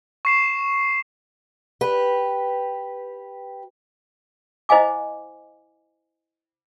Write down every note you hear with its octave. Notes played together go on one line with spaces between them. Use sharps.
C#6 C7 E7
G4 B4
E4 C5 D#5 F5 G#5 D6